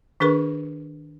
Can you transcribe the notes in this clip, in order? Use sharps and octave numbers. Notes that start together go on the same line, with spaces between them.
D#3 D4 G#4 A#4 B4 C#6